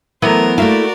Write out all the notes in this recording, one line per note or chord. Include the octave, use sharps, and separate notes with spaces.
E3 F#3 A3 B3 A#4 C5
A3 A#3 E4 F#4 A#4 D5 F5